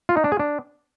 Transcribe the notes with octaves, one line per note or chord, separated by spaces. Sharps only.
F4
D#4
D4
G#4
D4